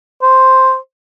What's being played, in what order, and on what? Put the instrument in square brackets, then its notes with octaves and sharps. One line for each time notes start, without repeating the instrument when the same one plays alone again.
[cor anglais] C5